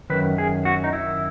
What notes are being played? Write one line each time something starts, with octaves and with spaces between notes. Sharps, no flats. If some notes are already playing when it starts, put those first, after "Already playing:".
F#2 D#3 B4
G#4
F#4
D#4
E4